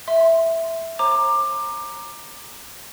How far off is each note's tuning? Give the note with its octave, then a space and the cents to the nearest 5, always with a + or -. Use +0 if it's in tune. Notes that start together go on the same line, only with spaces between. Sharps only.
E5 +0 C6 -5
C5 +45 A#5 +0 D6 +20